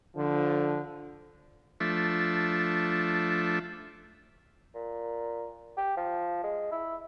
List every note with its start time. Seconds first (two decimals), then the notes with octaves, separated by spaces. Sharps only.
0.15 D3 F3
1.80 F3 A3 D4 E5
4.75 A#2
5.77 G4
5.97 F3
6.44 G#3
6.72 E4